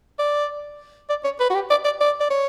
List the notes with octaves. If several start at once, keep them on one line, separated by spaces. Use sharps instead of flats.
D5
D5
C#5
B4
F#4
G4
D5
D5
D5
D5
C#5